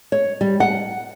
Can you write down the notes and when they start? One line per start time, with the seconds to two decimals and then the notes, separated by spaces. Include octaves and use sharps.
0.12 C#5
0.41 G3
0.60 F#5